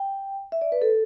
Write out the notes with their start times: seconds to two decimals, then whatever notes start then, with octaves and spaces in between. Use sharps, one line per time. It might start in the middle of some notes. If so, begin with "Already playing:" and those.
Already playing: G5
0.52 E5
0.62 D5
0.72 B4
0.82 A4